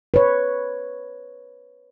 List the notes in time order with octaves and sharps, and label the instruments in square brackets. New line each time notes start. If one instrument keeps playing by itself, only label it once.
[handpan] B4 C#5